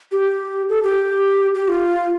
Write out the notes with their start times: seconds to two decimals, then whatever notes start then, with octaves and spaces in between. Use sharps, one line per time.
0.12 G4
0.69 A4
0.83 G4
1.54 G4
1.68 F4